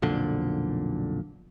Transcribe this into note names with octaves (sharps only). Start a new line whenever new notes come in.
B1 F2 A#2 D3